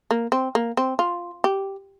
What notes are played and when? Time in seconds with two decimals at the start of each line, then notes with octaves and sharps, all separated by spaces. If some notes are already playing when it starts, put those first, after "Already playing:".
0.11 A#3
0.32 C4
0.55 A#3
0.77 C4
0.99 F4
1.44 G4